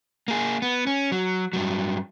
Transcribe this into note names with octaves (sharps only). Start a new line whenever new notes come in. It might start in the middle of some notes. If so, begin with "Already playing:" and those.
A#3 G#4
B3
C#4
F#3
G2 F#3